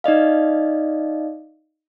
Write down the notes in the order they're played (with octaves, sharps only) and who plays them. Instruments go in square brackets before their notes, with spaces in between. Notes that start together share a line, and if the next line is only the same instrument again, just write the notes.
[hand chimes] D#4 D5 D#5 F5